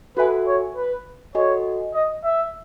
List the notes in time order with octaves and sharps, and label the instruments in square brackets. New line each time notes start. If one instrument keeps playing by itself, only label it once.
[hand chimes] F#4 A4 E5 G#5 [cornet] B4
[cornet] C#5
B4
[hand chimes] F#4 A4 D#5 G#5 [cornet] C#5
[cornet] D#5
E5